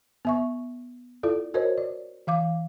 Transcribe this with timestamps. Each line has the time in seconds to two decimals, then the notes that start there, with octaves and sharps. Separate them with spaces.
0.25 B3 E5 C#6
1.23 E4 F4 A4 D5
1.54 F#4 A#4 C5 C#5 D#5
1.78 D5
2.27 E3 F5 D6